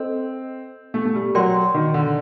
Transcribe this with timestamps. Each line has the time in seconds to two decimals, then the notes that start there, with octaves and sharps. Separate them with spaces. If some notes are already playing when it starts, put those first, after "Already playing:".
Already playing: C4 A4 D#5
0.94 A3
1.05 A3
1.15 G3
1.35 F#3 A#4 D5 G5 C6
1.74 D#3
1.94 D3